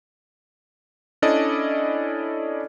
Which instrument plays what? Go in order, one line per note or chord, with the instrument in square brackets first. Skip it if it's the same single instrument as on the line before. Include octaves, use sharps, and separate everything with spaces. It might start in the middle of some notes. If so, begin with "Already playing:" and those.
[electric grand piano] C#4 D4 E4 A4 D5 D#5